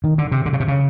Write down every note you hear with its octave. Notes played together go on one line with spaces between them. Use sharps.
D#3
D3
C3
D3
C#3
C3
C#3